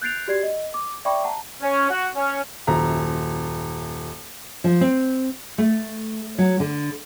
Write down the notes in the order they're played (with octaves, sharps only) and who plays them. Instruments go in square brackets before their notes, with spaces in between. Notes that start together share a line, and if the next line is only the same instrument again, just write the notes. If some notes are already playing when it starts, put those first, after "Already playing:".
[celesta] F#6 G6 A6 C7 D7 F7
F#4 G4 D5 G#6 C7
D#5
D6
D5 E5 G5 B5 C#6 D6
F#5 A5 A#5
[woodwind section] C#4
F#4
C#4
[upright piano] D#1 F#2 A#5
[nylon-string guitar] F3
C4
A3
F#3
D3